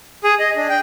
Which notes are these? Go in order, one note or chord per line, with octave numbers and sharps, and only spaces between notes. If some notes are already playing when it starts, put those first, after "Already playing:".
G#4
D#5
D4
G5